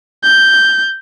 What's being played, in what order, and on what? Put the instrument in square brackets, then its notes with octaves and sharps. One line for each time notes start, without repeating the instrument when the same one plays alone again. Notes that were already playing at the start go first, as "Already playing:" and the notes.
[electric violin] G6